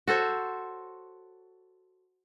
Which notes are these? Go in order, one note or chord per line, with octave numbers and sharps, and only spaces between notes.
F#4 A4 C5 C#5